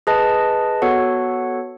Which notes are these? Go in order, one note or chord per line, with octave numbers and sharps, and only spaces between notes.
G#4 B4 D#5 A5
B3 F#4 A4 C#5 F#5